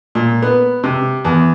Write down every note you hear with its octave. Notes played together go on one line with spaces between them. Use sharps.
A#2
B3
C3
E2